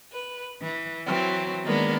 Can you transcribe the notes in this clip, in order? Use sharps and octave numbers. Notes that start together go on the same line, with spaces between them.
B4
E3
E3 F#3 C4
D#3 G#3 A#3 B3 D4